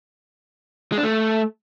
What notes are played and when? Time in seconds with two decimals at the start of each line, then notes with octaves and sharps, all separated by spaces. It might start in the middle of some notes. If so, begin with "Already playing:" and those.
0.92 G#3
0.98 D4
1.03 A3